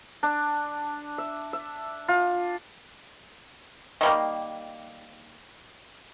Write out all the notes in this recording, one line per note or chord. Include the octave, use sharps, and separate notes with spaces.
D4
E5
E5
F4
D#3 G3 A#3